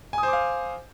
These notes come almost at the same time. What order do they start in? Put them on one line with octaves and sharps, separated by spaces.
G#5 D#6 C5 D6 F5